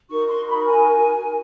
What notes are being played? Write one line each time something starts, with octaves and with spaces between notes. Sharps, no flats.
D#4 F#4 A#4 C#6
C6
B5
G#5